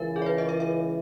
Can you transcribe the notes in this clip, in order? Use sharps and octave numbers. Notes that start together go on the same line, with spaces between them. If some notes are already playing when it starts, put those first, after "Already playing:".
Already playing: C#2 C#3 E3 A#4
G#4
C#5
B4
D#5
E5
E5